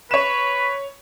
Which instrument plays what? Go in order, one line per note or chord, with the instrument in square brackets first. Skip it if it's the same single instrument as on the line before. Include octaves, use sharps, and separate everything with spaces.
[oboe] B4 [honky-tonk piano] C#5 E7